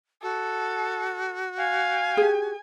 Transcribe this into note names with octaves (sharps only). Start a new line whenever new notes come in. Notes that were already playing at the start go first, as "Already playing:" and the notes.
F#4 A4
F5 G#5
G4 G#4